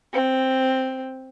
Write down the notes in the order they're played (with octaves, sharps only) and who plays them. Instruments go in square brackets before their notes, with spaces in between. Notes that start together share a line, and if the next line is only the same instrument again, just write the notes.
[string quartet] C4